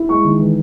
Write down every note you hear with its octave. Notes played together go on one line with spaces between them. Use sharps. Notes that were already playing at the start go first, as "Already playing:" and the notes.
Already playing: E4
G#3 C#6
D#3
E3